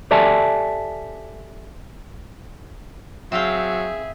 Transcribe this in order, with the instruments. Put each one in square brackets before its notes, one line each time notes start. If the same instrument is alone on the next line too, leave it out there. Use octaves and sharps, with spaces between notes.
[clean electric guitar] G4 A4 D5 E5 G#5 A5
[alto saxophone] F#3 [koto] C4 F5 G5 [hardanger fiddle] G#4 [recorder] E5